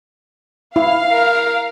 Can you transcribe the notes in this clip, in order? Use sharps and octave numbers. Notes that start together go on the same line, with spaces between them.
E4 F5
A#4